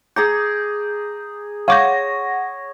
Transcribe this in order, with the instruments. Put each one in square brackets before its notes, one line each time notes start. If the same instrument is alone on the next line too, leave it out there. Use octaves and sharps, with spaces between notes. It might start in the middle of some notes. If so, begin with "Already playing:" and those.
[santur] G#4 A#5 D6 [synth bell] G6
[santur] C#5 [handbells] F5 D6 G6 [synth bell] F#5 C#6 A#6